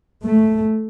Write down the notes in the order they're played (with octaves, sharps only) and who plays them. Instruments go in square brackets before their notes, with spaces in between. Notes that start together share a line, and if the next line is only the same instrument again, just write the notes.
[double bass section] A3